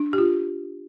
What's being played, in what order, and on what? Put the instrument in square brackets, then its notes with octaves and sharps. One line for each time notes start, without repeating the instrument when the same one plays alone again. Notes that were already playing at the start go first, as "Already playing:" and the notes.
Already playing: [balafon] D4
G4
F4